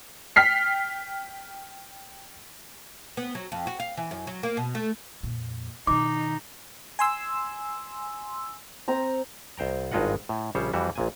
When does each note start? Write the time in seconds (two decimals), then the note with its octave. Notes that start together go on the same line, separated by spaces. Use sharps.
0.36 G5 F6 B6 C7
3.17 B3
3.35 F#3
3.52 F2
3.67 F#4
3.80 F5
3.97 E3
4.11 F#2
4.27 F#3
4.43 A#3
4.57 B2
4.75 A3
5.23 F2 A#2
5.87 B2 D#3 D#4 D6
6.99 G#5 C6 E6
8.88 C4 A#5
9.58 C2 C5 G5 A#5
9.92 G#1 G2 G#3 F4 D#5 F#5
10.29 A2
10.55 A#1 C#3 G3 C5 C#5
10.73 F2 E3 G3 F#4 E5
10.96 A#1 A#2 G#5